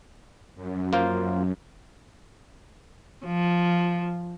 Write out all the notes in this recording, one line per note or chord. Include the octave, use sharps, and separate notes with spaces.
F#2
A#3 F4 C5
F3